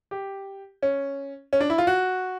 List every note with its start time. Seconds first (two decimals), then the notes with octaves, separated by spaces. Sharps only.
0.11 G4
0.83 C#4
1.53 C#4
1.60 D4
1.70 E4
1.78 F4
1.87 F#4